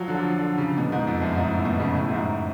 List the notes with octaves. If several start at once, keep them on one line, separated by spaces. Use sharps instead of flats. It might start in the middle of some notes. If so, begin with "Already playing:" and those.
Already playing: F3 F#3
D3
F3
D3
C#3
B2
G#2
F2
F#2
G#2
A2
B2
C#3
A2
F#2
G#2